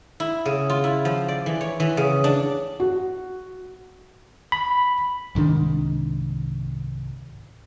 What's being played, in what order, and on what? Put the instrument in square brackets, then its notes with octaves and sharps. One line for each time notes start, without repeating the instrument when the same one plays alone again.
[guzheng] E4
C#3
F4
E4
F3
D5
E3
C#5
E3
C#3
D4
[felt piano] F#4
[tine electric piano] B5
[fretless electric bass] C2 G#2 D#3 D4